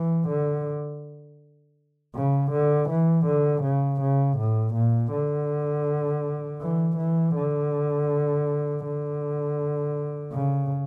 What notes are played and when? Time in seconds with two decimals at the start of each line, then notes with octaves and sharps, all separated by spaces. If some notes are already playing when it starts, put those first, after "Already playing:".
Already playing: E3
0.28 D3
2.15 C#3
2.51 D3
2.89 E3
3.26 D3
3.63 C#3
4.01 C#3
4.38 A2
4.74 A#2
5.12 D3
6.61 E3
6.97 E3
7.35 D3
8.84 D3
10.32 C#3